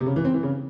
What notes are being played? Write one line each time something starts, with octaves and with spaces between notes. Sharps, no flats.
C3
C#3
E3
C4
E3
C#3